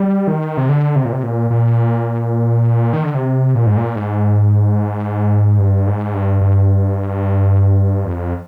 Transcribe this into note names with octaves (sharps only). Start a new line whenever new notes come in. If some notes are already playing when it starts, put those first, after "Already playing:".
Already playing: G3
D#3
C3
D3
C3
A#2
C3
A#2
A#2
D#3
D3
C3
A#2
G#2
A#2
G#2
G2
G#2
G2
G2
F2